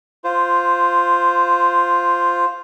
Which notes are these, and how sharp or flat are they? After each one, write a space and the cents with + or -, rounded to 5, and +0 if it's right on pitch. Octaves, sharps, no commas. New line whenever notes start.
F4 +0 C5 -10